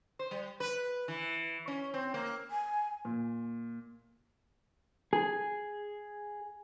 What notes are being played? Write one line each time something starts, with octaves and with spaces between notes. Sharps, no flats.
C5
G3
B4
E3
C#4
C4
A#3
G#5
A#2
G#4